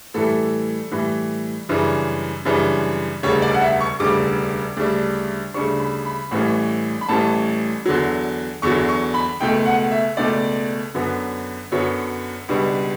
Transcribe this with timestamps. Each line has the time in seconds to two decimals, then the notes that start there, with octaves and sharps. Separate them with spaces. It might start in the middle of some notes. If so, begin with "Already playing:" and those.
0.14 A2 E3 G3 A4
0.92 A2 E3 G3
1.69 F#2 C#3 E3 G3 D4
2.45 F#2 C#3 E3 G3 D4
3.23 E1 D2 C#3 G3 C#5
3.42 D5
3.54 F#5
3.61 E5
3.80 C#6
4.00 E1 D2 C#3 G3 D6
4.77 D2 C#3 G3 D4
5.54 D2 C#3 G3 D4 C#6
5.80 B5
6.05 B5
6.31 A1 A2 E3 G3 C#4
7.01 B5
7.08 A1 A2 E3 G3 C#4 A5
7.85 E2 D3 F#3
8.62 E2 D3 F#3 C#6
8.89 C#6
9.14 B5
9.40 C#2 B2 A3 G5
9.66 F#5
9.91 E5
10.17 C#2 B2 A3 D5
10.95 F#2 D3 F#3 B3
11.72 F#2 D3 F#3 B3 C#5
12.49 C#2 B2 G3 B3 D4